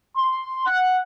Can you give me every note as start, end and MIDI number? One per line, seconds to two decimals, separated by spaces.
0.17 0.62 84
0.66 0.98 78